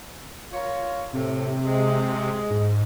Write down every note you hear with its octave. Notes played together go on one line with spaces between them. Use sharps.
F4 A#4 C#5
A2 C3
G#3
G#2